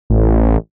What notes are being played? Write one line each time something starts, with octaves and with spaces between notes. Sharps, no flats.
A1